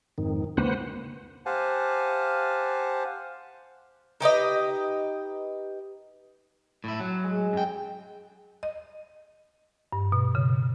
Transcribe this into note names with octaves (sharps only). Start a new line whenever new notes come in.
F2 G#2 D#3
C#2 A#3 B4 C5 F#5
G4 C5 F5 F#5 G#5 A5
D#4 G4 B4 D#5
A2 E4
F#3
G#3
F#2 G5
D#5
G2
B2
C#3